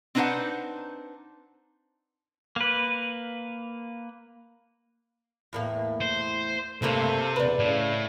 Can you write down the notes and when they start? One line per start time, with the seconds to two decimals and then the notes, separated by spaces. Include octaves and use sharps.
0.15 C4 D4 D#4 B4 C5 F#5
2.56 A#3 B4
5.53 E2 A2 A#3
6.01 C5
6.82 G2 C3 A3 A#3 A4 C5
7.36 E2 B4 D5
7.59 A2 C#3